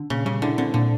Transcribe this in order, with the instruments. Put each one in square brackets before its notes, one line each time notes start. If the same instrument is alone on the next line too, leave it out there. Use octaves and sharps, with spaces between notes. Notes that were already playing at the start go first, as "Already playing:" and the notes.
Already playing: [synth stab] D3
[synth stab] A#2 [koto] C#3
[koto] C#3 [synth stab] G3
[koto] D3 [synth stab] E4
[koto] D3 [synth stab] C4
[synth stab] A#2 [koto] D3